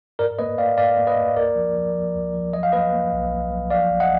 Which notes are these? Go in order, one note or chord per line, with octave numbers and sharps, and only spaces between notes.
G#2 A#4 D5
A#3 B4 D#5
A#3 D5 F5
G#2 D5 F5
A#3
B4 D#5
A#3
D2 A#4 D5
F3
F3
F3
D2
F3
F#3 D#5
F5
A#3 B4 D#5
A#3
B1
A#3
F#3
F3 D5 F5
A#1
D#5 F#5